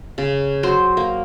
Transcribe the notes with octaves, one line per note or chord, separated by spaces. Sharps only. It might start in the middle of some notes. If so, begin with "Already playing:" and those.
C#3
F#3 C5 C6
A#3